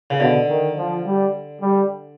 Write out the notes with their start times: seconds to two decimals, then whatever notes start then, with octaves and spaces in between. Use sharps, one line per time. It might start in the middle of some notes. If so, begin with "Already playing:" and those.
0.10 C#3
0.20 B2 D3
0.48 D#3
0.76 F3
1.05 G3
1.61 G3